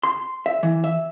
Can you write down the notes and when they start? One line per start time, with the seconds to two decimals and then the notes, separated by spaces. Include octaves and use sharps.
0.03 C6
0.46 E5
0.63 E3
0.84 E5